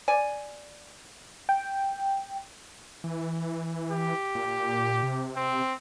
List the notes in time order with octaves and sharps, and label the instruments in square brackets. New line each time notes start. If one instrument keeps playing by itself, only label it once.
[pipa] D5 G#5
[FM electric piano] G5
[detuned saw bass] E3
[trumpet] G4
[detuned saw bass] A#2
C3
[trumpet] C4